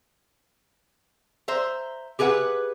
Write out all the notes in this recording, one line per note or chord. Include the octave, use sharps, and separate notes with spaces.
C5 E5 A#5
G4 G#4 B4 E5 F#5